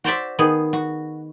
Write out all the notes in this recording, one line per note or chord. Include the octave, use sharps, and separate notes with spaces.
F#4 C5 D5 E5
D#3 B3 G#4
F#4